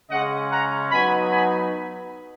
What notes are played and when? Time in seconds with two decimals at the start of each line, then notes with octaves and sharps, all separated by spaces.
0.10 C#3 G#3 C#4 D#5 F#5
0.51 F#5 A#5
0.92 F#3 B3 D#4 G#5 B5
1.32 G#5 B5